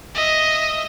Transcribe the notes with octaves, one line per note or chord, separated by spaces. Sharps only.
D#5 E5